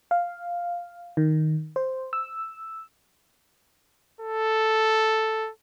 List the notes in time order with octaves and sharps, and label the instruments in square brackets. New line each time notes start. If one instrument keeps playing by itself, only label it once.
[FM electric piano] F5
D#3
C5
E6
[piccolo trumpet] A4